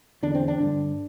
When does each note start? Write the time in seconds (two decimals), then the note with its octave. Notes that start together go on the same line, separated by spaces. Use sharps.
0.23 E2 D3 D4
0.35 C4
0.48 D4
0.60 G2 D3